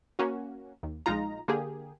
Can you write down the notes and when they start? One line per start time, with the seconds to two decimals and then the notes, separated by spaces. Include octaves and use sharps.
0.19 A#3 C#4 F#4
0.83 D#2
1.06 A#1 G#3 D#4 F4 A#5
1.48 D3 A#3 G4 G#4